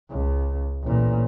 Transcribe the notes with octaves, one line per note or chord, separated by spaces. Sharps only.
C#2
A1 A#2